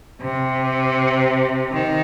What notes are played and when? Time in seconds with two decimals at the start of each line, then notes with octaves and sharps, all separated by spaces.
0.22 C3
1.72 D#3